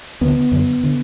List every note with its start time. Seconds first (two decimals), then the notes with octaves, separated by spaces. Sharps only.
0.21 D2 D3 B3
0.52 F#2 D3
0.83 D3